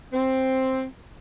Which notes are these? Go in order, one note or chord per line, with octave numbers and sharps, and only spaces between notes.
C4